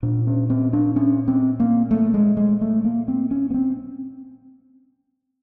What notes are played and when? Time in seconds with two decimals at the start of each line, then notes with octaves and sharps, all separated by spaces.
0.03 A#2 D4
0.27 C#4
0.50 C4
0.73 D4
0.96 C#4
1.28 C4
1.60 A#3
1.91 A3
2.14 G#3
2.37 G#3
2.61 A3
2.85 A#3
3.08 C4
3.31 C#4
3.50 B3
3.54 C4